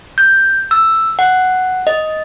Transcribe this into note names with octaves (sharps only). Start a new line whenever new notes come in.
G6
E6
F#5
D#5